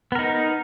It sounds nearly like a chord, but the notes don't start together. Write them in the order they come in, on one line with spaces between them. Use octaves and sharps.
B3 A#4 D#4